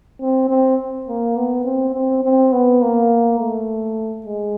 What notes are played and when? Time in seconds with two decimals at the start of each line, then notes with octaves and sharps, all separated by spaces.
0.21 C4
0.49 C4
1.08 A#3
1.37 B3
1.65 C4
1.94 C4
2.23 C4
2.52 B3
2.82 A#3
3.39 A3
4.26 G#3